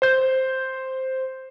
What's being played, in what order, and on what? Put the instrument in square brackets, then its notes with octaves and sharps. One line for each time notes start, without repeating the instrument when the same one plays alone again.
[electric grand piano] C5 G6